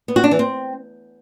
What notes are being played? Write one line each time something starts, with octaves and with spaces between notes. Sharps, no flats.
B3
F#4
D4
E3
C4